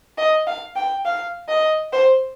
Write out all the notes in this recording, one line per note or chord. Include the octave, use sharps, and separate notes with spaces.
D#5
F5
G5
F5
D#5
C5